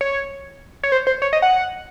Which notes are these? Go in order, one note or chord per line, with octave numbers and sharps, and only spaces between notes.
C#5
C#5
C5
C5
C#5
D#5
F#5